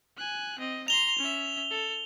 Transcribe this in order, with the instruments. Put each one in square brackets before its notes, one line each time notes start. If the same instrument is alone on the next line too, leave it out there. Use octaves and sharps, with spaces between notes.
[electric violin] G#5 F#6
C4 D#5
[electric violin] A#5 C6 [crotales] F7 G7
[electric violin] C#4 E5
A4